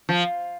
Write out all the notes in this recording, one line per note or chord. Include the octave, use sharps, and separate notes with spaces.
F3